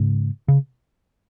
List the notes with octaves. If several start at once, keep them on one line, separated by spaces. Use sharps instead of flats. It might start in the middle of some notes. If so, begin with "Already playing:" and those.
Already playing: G#2 C#3
C#3